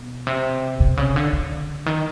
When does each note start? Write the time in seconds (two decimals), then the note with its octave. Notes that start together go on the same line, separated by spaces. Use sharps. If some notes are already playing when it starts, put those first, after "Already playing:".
Already playing: B2
0.27 C3
0.80 C3
0.97 C#3
1.16 D3
1.33 D3
1.86 D#3